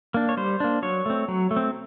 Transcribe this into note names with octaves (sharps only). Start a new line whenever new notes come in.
A#3 D4
C#5
G3 C5
A#3 D4
F#3 C#5
A3 C4
F#3
A3
C4